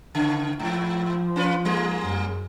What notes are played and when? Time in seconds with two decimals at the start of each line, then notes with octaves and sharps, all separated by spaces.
0.15 C#3
0.60 G#2 F3
1.36 C#4 F4 B4
1.65 G#2 G3 A#3
2.02 F#2